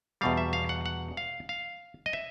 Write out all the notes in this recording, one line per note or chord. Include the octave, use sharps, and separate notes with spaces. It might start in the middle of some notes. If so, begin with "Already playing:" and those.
E2 B2 G3 F5
E5
F5
F#5
F#5
F5
F5
D#5
E5